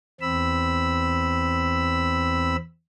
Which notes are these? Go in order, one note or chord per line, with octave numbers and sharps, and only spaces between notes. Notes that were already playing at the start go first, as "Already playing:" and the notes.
E2 C4 B5 E6